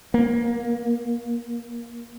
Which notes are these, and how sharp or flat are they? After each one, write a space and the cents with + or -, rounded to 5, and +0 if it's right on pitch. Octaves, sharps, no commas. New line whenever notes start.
A#3 +20